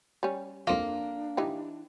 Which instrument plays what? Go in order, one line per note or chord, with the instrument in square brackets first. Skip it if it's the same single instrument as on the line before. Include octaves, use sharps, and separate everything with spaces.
[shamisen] G3 C#4
[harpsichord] F2 F4 [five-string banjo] A#3 [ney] D4
[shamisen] E3 D#4 G4